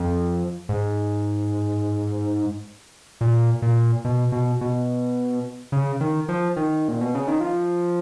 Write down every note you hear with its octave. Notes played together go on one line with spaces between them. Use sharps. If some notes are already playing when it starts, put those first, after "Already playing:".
Already playing: F2
G#2
A#2
A#2
B2
B2
B2
C#3
D#3
F3
D#3
A#2
B2
C#3
D#3
F3